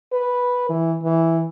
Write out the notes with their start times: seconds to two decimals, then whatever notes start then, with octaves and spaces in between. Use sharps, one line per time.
0.13 B4
0.69 E3
1.04 E3